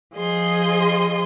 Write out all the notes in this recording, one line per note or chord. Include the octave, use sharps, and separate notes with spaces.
F3 G#4 D#5 C6